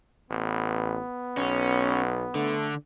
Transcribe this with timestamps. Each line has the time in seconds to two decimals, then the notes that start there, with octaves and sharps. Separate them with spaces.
0.31 A1 B3
1.37 B1 C#4
2.35 D3 A3